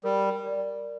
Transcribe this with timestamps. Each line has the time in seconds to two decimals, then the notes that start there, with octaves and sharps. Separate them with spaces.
0.04 G3 A#4
0.46 D5